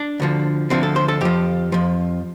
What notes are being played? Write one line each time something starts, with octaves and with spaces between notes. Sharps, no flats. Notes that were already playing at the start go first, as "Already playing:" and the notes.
Already playing: D4
D2 D3 F3
D2 D3 F3 C4
A4
C5
A4
F2 F3 G4
F2 F3